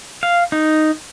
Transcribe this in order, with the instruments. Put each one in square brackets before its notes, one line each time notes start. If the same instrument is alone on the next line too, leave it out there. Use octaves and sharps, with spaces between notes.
[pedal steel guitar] F5
D#4